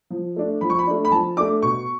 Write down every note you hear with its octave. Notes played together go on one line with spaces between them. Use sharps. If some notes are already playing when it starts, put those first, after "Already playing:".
F3
A3 D4
F3 B5
C#6
B5
A3 D4
B5
F3 A5
A3 D4 D6
B2 C#6